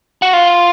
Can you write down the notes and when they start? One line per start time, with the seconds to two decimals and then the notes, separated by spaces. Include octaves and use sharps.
0.22 F#4
0.33 F4